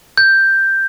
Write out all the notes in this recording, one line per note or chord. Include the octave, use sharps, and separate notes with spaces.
G6